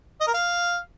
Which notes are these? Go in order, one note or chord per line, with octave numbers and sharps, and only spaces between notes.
D#5
A#4
F5